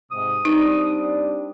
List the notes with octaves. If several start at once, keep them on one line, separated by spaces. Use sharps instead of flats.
G#2 C3 D#6
G3 C4 D4 D#4